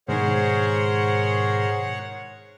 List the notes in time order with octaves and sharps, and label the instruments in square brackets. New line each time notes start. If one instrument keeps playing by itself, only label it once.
[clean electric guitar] G#2 B2 D#3 [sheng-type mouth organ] G#4 A#4 C5 [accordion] C#5 F#5